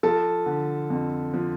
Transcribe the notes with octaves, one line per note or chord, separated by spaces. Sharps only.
F3 A4 A5
D3
F2
F3